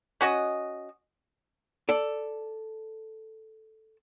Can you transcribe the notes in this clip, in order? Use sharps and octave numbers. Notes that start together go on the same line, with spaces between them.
C#4 F#4 D#5
A4 D5